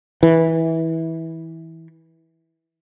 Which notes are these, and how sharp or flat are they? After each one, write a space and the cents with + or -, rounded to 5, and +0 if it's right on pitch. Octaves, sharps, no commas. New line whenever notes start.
E3 -20